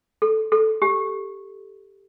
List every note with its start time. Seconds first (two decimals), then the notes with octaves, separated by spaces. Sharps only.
0.22 A4
0.52 A4
0.82 G4